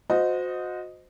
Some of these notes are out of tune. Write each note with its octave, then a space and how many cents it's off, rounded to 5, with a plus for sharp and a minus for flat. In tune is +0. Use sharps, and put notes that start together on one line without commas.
F#4 -30 C5 -20 D#5 +0